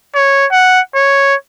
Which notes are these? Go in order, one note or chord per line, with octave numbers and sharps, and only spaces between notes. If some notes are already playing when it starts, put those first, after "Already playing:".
C#5
F#5
C#5